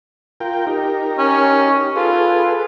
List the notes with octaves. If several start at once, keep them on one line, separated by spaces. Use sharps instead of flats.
F4 A#4 G5
D#4 G4 A#4
C#4
F4 G#4 A4 B4